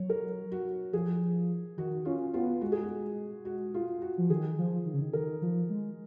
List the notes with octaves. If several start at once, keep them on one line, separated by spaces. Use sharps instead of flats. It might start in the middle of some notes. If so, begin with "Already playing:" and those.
Already playing: F#3 C#5
A#4
F#4
F3 G#4
D#3 F#4
C#4 F4
B3 F4
G#3 F#4
G#4
F#4
F#4
F4
F#4
F3
D#3 G#4
F3
D#3
C#3
D#3
D#3 A#4
F3
G#3